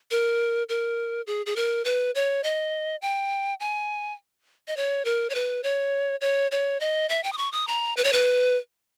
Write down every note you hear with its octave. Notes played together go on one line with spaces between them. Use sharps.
A#4
A#4
G#4
G#4
A#4
B4
C#5
D#5
G5
G#5
D#5
C#5
A#4
C#5
B4
C#5
C#5
C#5
D#5
E5
G5
D#6
C#6
D#6
A#5
B4
C#5
B4